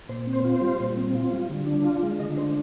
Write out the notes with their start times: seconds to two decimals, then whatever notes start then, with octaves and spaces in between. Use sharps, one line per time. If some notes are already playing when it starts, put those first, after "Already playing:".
0.09 A#2 C5
0.27 C4
0.33 C5
0.45 F4
0.56 C5
0.61 G3
0.80 A#2
0.97 C4
1.15 F4
1.32 G3
1.49 D3
1.67 D4
1.84 F4
2.03 G#3
2.19 D3 D#5
2.37 D4 C5